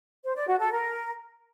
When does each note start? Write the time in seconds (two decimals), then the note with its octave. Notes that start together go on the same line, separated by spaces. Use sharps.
0.24 C5
0.36 D5
0.48 F#4
0.60 A4
0.72 A#4